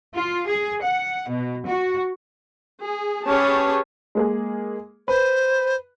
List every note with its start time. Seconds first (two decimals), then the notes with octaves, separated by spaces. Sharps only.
0.15 F4
0.48 G#4
0.82 F#5
1.28 B2
1.67 F#4
2.82 G#4
3.26 C#4 G4 G#4 B4 C#5 A5
4.15 G#3 A#3 G#4
5.08 B4 C5